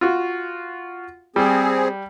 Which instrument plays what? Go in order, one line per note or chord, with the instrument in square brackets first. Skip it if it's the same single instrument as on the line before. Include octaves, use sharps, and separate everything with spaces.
[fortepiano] F4 F#4
[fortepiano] G3 [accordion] C4 G#4